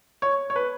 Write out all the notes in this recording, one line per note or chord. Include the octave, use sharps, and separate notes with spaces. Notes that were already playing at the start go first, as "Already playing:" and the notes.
C#5
C#5
B4